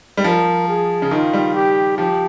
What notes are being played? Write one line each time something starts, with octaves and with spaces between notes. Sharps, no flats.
G3
F3 A#4
G#4
C#3
D#3 F4
G3
G4
F3 G4